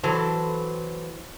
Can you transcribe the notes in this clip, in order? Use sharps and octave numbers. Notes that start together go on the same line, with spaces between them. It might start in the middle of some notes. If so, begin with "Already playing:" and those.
E3 F#3 A4 C5